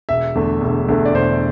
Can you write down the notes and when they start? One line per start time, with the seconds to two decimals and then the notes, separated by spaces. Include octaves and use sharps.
0.09 E1 E5
0.35 E2 D3 A3
0.61 E1
0.88 E2 D3 A3
1.06 D5
1.14 E1 C5